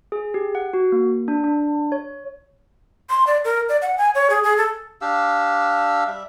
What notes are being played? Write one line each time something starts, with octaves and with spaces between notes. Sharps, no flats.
G#4
G4
F#5
F#4
A#3
D4
D4
C#5
C6
D5
A#4
D5
F#5
G#5
C#5
G#4
G#4
A4
D4 G4 F5 E6
G3 E5